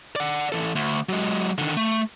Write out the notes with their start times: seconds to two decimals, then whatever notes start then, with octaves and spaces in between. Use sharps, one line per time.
0.16 D5 F#5
0.52 E3 A4
0.75 D2
1.09 F#3 G#3
1.58 D3 D#3
1.77 A3